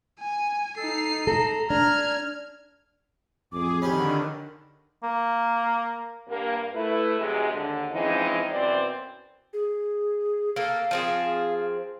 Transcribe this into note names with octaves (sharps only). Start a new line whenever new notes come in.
G#5
D#4 A4 C7
A4 A#5
D4 F6 G#6
A1 F2 G#4 D6
D3 D#3 C#4 G4 B5
A#3
G2 A#3
A3 E4 B4
G#2 C3 F#3 G#3
D#2 D3
E3 F3 G#3 C4 C#4 D#4
F#2 B2 E3 C4 C5 D5
G#4
A#3 A4 F5
F3 C4 G#4